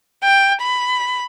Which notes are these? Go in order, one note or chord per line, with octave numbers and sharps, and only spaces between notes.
G5
B5